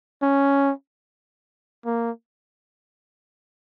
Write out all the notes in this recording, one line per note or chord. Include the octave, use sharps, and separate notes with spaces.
C#4
A#3